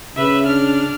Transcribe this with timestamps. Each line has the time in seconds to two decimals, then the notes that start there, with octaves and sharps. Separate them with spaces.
0.16 C#3 B4 E5
0.46 D4 F6